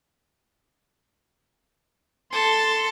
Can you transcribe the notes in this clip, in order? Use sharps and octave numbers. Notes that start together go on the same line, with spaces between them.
A4 C6